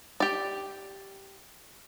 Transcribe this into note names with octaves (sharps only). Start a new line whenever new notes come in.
G4 D5